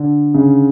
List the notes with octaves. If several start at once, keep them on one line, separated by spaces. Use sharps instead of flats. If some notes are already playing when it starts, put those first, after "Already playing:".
Already playing: D3
C#3